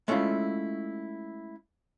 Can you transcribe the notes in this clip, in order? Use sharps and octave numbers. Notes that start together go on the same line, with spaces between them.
G#3 A3 C#4 E4 F4